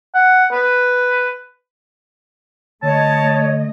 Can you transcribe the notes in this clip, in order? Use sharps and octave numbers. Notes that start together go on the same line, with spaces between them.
F#5
B4
D3 A3 C#5 D#5 A5